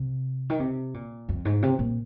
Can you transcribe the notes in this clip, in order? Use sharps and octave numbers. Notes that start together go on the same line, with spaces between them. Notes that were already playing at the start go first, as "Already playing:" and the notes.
Already playing: C3
D#3
C3
A#2
F2
G#2
C3
A#2